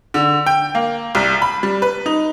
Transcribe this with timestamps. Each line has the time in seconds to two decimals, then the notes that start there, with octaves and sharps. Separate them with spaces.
0.14 D3
0.46 G5
0.75 A#3
1.15 C2
1.42 B5
1.63 G3
1.82 B4
2.06 D#4